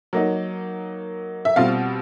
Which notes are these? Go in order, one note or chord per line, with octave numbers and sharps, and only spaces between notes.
F#3 A#3 D#4
E5
B2 G3 C4 F4 F5